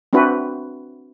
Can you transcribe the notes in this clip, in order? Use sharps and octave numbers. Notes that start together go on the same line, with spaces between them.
C4 D4 E4 F#4 B4